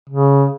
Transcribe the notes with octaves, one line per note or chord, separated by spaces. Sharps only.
C#3